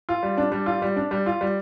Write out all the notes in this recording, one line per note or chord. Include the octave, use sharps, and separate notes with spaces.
F4
G3
D4
G3
F4
G3
D4
G3
F4
G3